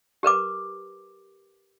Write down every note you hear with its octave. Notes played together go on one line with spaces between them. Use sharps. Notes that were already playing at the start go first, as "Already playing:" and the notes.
G4 A#4 B4 D6